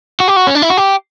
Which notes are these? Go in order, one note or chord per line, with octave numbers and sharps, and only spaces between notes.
F#4
G4
F#4
C#4
D4
E4
F#4
G4